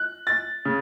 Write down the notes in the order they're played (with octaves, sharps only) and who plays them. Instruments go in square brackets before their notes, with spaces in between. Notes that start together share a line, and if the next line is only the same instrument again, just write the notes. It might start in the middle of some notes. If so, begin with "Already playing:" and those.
Already playing: [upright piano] F#6
A6
C#3